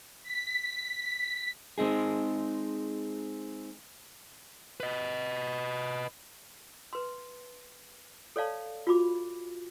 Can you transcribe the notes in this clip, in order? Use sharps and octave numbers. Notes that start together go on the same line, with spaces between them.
B6
G#3 C4 D#4 G#4
B4 D#5
B4 C6
A4 C#5 D5 F5 A5
F4 F#4 B5 D6